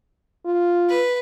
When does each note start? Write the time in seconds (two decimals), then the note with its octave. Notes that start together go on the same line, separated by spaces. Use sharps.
0.45 F4
0.89 B4